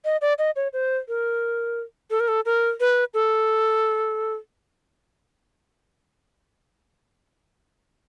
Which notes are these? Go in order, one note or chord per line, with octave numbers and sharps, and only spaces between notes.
D#5
D5
D#5
C#5
C5
A#4
A4
A#4
A4
A#4
B4
A4